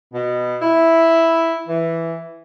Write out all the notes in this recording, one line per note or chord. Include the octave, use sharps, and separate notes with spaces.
B2
E4
E3